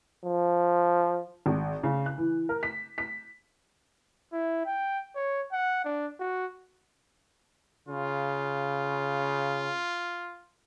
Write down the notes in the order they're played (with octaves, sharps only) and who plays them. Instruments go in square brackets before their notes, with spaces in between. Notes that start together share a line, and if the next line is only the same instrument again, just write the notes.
[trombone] F3
[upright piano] G#1
C#3
F#6
E3
A#4
B6
B6
[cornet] E4
G5
C#5
F#5
D4
F#4
[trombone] C#3 [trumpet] F4